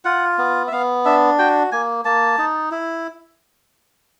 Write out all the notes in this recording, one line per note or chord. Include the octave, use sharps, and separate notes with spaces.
F4 F#5
B3
E5
B3 F5
D4 E5
F#4 G5
A#3 G#5
A#3 A5
D#4
E4